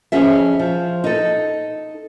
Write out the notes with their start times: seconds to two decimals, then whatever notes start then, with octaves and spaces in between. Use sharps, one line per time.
0.12 F2 C#4 G#4 E5
0.59 F3
1.04 D#4 A4